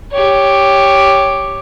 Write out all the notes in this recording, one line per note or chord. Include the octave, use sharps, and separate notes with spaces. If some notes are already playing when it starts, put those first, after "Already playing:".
G4 C#5